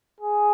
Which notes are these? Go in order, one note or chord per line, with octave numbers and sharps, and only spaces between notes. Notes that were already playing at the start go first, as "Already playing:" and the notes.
G#4